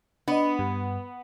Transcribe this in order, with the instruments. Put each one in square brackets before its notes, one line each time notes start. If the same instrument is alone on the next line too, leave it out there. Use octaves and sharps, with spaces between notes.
[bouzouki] B3 [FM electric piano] D4 D#5
[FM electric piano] G2